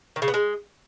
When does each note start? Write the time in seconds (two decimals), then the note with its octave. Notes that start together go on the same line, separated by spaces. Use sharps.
0.16 D#3
0.22 C#3
0.28 B3
0.34 G#3